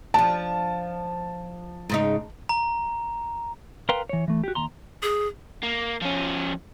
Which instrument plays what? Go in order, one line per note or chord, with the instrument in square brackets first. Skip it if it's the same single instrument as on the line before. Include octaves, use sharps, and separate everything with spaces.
[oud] F3 D4 [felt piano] A5
[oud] G#2 C#3 D#4
[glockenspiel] A#5
[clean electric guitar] A#4 B4 F5 G5 A#5 C6
E3 C#5
E3 A3
F#4 G4
D#2 A#5 C6
[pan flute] G#4
[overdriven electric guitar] A#3
F3 C#4